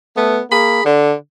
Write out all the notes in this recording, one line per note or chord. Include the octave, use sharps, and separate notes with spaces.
A3 B3
A#3 G#4 B5
D3